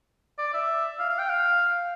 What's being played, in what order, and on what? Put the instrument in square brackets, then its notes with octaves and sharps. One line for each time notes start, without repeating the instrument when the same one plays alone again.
[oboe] D5
E5
F5
F5
G5
F5